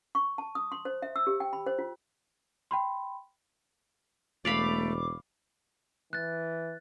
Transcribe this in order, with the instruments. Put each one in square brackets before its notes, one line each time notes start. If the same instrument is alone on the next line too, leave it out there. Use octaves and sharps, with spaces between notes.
[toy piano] C#6
A5
D#6
C6
C5
E5
E6
G4
G5
B5
C5
F4
[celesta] G5 B5 C6
[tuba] E1 [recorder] A3 [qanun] D5 F5 B5 [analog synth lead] D6
[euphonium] E3 [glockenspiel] F#6 A6